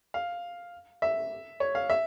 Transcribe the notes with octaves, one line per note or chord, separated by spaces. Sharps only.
F5
E5
C#5
F5
E5